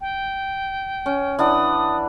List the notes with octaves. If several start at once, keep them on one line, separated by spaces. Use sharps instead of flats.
G5
C#4
E3 D4 F#5 D#6